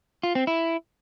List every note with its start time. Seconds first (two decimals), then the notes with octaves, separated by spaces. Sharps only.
0.23 F4
0.35 C4
0.47 E4